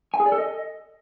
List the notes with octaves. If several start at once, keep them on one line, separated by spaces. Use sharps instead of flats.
G#5
G#4
D5
A4
D#5